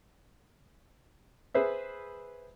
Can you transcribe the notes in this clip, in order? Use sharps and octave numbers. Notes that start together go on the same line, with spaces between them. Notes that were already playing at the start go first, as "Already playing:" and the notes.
G#4 B4 C5 E5